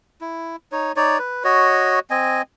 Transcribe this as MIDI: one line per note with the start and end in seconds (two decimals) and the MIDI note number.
0.21 0.56 64
0.72 0.92 63
0.72 0.92 73
0.96 1.18 63
0.96 1.18 73
0.96 1.18 74
1.19 1.43 71
1.44 1.99 66
1.44 1.99 73
1.44 1.99 75
2.10 2.42 60
2.10 2.42 75
2.10 2.42 80